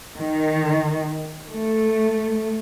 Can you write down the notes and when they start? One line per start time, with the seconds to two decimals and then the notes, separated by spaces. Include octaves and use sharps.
0.16 D#3
1.49 A3